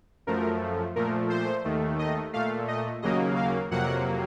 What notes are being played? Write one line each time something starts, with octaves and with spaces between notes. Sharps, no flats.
F#2 F3 A3 A#4
A#2 F3 A3 A#4
C5
D#2 D#3 A3
D#5
A#2 A3 F5
D#5
D#2 C#3 F#3 A#3 D#5
F5
F2 C3 F#3 A#3 F#5